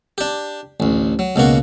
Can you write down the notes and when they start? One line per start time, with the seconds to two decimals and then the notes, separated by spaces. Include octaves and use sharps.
0.18 D4 G4
0.80 A1 D2
1.19 F#3
1.36 C#2 B2 A#3 F#4